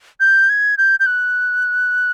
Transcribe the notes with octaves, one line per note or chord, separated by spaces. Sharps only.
G6
G#6
G6
G6
F#6